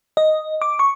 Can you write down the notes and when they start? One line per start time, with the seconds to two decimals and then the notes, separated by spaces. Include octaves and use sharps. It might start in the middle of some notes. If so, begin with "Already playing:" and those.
0.17 D#5
0.62 D6
0.79 C#6